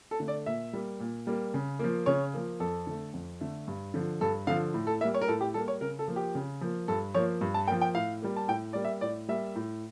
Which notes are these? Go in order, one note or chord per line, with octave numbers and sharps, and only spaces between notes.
A4
D3 A3
D5
A#2 E5
G3 A#3
A#2
G3 A#3
C#3
F3 A#3
C#3 C#5
F3 A#3
F2 A4
D3 A3
F2
D3 A3
G2
D3 F3
G2 A4
D3 F3 F5
A2
A4
G3 A#3 E5
C#5
A#4
A2 A4
G4
G3 A#3 A4
C#5
C#3 A#4
A4
F3 A#3
G4
C#3
F3 A#3
G2 A4
F3 A#3 C#5
G2
A5
F3 A#3 G5
G5
A2 F5
G3 A#3
A5
A2 G5
G3 A#3 D5
E5
A2 D5
G3 A#3 E5
A2